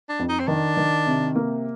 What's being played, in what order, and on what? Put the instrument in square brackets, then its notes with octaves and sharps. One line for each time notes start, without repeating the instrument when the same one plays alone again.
[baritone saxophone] D4
[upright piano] F2
[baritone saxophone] D#4
C4
[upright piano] D#3 [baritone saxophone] D4
[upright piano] D#3
C3
A#3